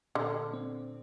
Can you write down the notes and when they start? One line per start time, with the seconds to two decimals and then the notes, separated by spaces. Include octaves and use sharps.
0.15 A#2 D3
0.54 C4